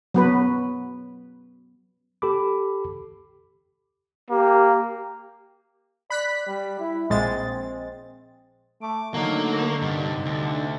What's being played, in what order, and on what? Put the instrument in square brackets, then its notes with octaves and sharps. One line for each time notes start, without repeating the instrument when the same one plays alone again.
[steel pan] F#3 B3 B4
[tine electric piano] G4 A4 B5 D6
[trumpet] A#3 [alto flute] G4
[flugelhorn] D5 [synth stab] B5 F#6 B6
[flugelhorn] G3
E4
[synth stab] A#1 G#3 A6 [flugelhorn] C4
[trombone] A3 [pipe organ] D6
[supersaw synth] D3 [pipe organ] D#3 A3 D#4 [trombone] F#3 [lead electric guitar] A#3
[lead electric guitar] G2 [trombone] C3 [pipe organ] D#4
[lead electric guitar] D2